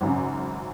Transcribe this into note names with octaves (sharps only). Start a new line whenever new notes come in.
G#1 F#2 C#3